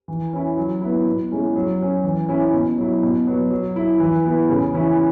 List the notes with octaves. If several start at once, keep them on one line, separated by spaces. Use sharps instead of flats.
E3
C#4 E4
F#3
B3 E4
B2
G#3 C#4 E4
F#3
C#4 F#4
E3
C#4 E4
B2
F#3 E4
B2
F#3 B3
F#3
E4
E3
B3 E4
C#3
E3 C#4 E4